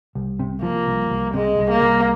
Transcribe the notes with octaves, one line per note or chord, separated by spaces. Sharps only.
C2
C3
F3 A#3
C2
C2
C3 G#3
C2
A#3
C2